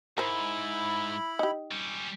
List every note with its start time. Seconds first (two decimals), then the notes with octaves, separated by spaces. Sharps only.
0.18 G#2 E4 A#4 C5 B5
1.39 D#4 G4
1.71 G3 C#4